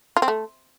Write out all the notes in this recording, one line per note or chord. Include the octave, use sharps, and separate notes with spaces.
F4
C4
A3